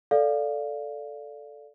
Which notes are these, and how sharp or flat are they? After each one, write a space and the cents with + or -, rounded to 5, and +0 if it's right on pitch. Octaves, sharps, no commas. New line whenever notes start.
A4 +0 D5 -5 F5 +0